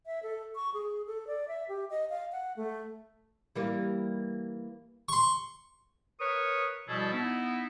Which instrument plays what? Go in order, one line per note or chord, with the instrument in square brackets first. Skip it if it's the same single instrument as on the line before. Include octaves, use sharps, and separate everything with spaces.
[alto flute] E5
A4
C#6
G#4
A4
D5
E5
G4
D#5
F5
F#5
A3
[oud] E3 G3 A#3
[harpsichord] C6 C#6
[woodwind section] A#4 B4 C#5 C#6 D#6
B2 F3 G3 E4 G#4 A4
B3 D#4 E4